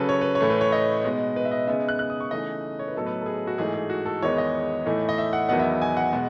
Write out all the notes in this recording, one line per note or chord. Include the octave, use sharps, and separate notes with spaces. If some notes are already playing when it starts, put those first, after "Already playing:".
Already playing: C#3 F#3 C#4 A4 B4
C#5
B4
C#5
A2 E3 A3
B4
C#5
D#5
B2 G#3 B3 D#4
B4
E5
D#5
C#3 G#3 B3 D#4 E5
F#6
F#6
D#6
C#6
C#3 E3 A3 D#4 D#5
C#5
B4
A2 F#3 B3 D#4 A4
B4
A4
G#4
F#4
G#2 E3 A3 D#4 G#4
G#4
F#4
A4
E2 D#3 G#3 B3 D#4 C#5
D#5
A2 E3 A3 D#4
D#5
E5
F#5
E2 D#3 F#3 B3 D#4 F#5
E5
G#5
F#5
B2 G#3